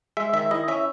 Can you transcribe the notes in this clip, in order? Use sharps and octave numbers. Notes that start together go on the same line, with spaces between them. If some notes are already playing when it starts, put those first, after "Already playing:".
G#3 E5
D#3 E5
E4 D#5
C#4 E5